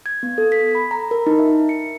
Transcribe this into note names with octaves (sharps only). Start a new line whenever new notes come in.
G#6
B3
A4
B6
B5
A#5
A#4
D#4
E5
C#7